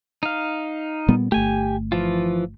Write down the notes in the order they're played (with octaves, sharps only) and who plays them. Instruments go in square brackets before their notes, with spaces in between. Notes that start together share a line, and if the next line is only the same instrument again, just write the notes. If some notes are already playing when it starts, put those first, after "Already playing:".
[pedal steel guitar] D#4 F5
[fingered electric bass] A#2 G3 B3
[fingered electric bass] G1 A3 [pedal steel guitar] G4 G#5
[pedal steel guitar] E3 F3 F4